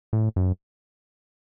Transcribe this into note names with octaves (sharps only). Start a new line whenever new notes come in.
A2
F#2